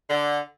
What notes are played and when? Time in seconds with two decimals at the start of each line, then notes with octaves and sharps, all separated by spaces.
0.10 D3